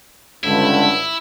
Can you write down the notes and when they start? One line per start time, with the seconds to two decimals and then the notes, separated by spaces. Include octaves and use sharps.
0.44 C#2 G2 D3 E4